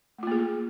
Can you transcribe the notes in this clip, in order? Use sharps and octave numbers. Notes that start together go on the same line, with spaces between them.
A3 A#3 F4 G#4